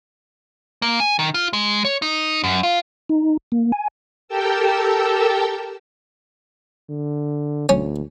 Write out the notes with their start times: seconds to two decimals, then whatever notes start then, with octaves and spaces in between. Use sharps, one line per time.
0.82 A#3
1.00 G#5
1.19 D#3
1.34 F4
1.53 G#3
1.85 C#5
2.02 D#4
2.44 F#2
2.63 F4
3.09 D#4
3.52 A#3
3.72 G#5
4.28 G4 A4 A#4 G5 A5 E6
6.90 D3
7.69 D2 C#4